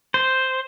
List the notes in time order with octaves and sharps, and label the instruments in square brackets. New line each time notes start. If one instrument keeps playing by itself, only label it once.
[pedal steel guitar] C5